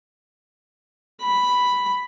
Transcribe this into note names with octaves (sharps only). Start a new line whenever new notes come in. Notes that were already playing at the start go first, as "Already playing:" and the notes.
B5